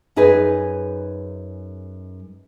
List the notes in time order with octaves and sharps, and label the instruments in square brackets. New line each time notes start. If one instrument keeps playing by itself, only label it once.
[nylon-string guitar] F#2 D#4 G#4 B4 G#5